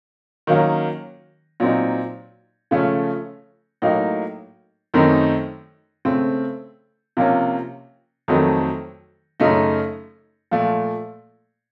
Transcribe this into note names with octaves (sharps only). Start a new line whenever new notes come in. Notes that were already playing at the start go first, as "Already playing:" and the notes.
D#3 F#3 A#3 C#4
A#2 F#3 C4 D#4
C#3 F3 A3 C#4
A2 F#3 A#3 D#4
F#2 D#3 A3 C4 D#4
C#3 A3 C4
C3 F3 A#3 C#4
F2 D#3 F#3 A3 C4
F#2 C#3 A3 D#4
A#2 F3 A3